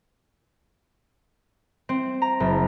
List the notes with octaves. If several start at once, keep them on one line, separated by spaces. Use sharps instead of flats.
C4
A#5
F#1